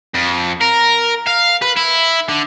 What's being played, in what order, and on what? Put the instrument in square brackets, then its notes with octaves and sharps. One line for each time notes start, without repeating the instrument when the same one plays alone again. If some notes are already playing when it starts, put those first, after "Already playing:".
[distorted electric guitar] F2
A#4
F5
B4
E4
D3